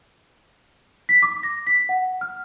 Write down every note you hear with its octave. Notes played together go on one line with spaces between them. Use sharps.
B6
D6
A#6
B6
F#5
F6